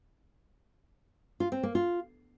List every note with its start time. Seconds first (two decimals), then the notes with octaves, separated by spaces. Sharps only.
1.40 F4
1.52 C4
1.63 A#3
1.75 F4